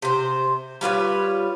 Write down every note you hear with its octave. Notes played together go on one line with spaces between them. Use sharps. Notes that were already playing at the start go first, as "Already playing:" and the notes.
C3 C5
G3 F4 B4 C#5